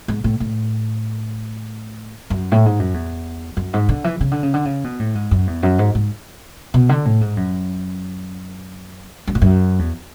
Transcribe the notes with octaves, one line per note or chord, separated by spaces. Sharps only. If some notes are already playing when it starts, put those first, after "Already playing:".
G#2
A2
A2
F#2
A2
G#2
F#2
E2
F#2
G#2
D3
E3
C#3
D3
C#3
D3
C#3
B2
A2
G#2
F#2
E2
F#2
G#2
G#2
B2
D3
A2
G#2
F#2
F#2
G#2
F#2
E2